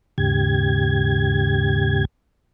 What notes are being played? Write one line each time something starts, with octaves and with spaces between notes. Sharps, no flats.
D#2 G#2 C#3 G4 G#6